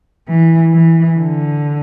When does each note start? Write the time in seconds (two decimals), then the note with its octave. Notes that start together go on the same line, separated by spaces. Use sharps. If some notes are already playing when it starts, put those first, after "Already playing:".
0.28 E3
0.73 E3
1.18 D3